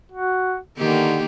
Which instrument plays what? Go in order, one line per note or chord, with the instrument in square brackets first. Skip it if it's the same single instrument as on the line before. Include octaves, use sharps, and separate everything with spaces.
[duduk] F#4
[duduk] D3 [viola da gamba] D#3 A#3 G4